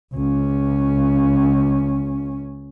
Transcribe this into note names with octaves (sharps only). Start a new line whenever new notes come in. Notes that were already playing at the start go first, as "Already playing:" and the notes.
C#2 C#4